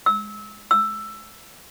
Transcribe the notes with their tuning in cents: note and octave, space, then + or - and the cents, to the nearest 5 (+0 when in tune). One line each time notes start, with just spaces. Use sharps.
E6 -25
E6 +10